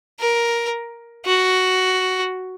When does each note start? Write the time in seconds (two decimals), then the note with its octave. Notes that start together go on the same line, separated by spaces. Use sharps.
0.20 A#4
1.26 F#4